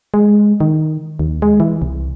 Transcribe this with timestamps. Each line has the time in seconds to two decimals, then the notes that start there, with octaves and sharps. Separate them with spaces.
0.14 G#3
0.60 D#3
1.19 D#2
1.42 G#3
1.60 E3
1.82 C2